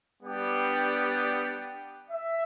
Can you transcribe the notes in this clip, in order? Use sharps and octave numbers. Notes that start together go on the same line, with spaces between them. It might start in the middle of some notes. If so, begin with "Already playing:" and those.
G3 B3 D4 G4
E5